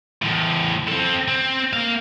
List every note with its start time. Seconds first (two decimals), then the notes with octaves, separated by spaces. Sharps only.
0.22 E2 A2
0.88 C4 A4
1.28 C4
1.73 A#3 F5